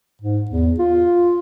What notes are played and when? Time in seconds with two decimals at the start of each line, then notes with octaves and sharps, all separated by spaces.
0.22 G#2
0.51 E2
0.79 F4